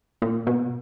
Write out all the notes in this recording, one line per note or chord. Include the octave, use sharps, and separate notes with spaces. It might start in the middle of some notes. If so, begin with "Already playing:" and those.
A#2
B2